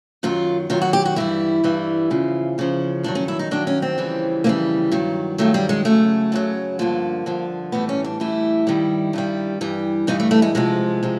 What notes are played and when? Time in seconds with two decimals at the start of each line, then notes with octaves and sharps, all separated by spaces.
0.23 F#2 D#3 F#3 F4
0.70 F#2 D#3 F#3 F4
0.82 F#4
0.93 G4
1.06 F#4
1.16 G2 E3 G3 E4
1.64 G2 E3 G3
2.10 E2 C#3 F3
2.58 E2 C#3 F3
3.03 G2 D#3 F#3 D4
3.15 C#4
3.28 E4
3.39 D#4
3.51 G2 D#3 F#3 D4
3.67 C#4
3.82 C4
3.98 F2 C#3 E3 G3
4.44 F2 C#3 E3 G3 A#3
4.92 G2 D#3 F#3
5.38 G2 D#3 F#3 A3
5.54 G3
5.69 G#3
5.85 F#2 C#3 F#3 A3
6.32 F#2 C#3 F#3
6.79 G2 D3 F3 A#3
7.26 G2 D3 F3
7.72 A2 E3 G3 B3
7.89 C#4
8.04 D4
8.20 A2 E3 G3 E4
8.67 G2 D#3 G3
9.13 G2 D#3 G3
9.61 G2 E3 G3
10.07 G2 E3 G3 D#4
10.20 A3
10.31 A3
10.42 G#3
10.55 F2 C3 F3 G#3
11.03 C3 F3